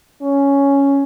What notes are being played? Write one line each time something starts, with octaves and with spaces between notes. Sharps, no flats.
C#4